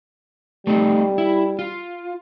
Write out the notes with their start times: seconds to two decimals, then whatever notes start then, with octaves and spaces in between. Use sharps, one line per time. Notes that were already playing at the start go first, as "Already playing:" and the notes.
0.67 G3 A3 C4 D#4
1.18 E4
1.59 F4